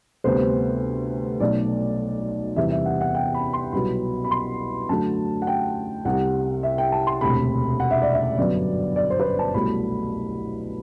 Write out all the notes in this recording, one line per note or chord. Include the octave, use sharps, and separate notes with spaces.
D2 C3 G3 B3 C5
B1 B2 A3 D5
E2 C3 E3 G3 B3 E5
E5
F#5
F#5
G5
B5
C6
C2 B2 F#3 B3 B5
B5
C6
F#2 D3 F#3 A3 A5
F#5
G5
C2 C3 G3 F#5
E5
G5
A5
C6
E1 D2 C3 B5
F#5
E5
D5
E5
G1 F#2 F#3 B3 D5
D5
C5
B4
C5
A5
C2 B2 F#3 A3 B5